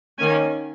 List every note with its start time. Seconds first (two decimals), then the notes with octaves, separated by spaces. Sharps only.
0.18 D#3 A#3 C#4 G#5